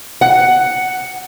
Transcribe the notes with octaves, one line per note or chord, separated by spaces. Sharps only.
F#5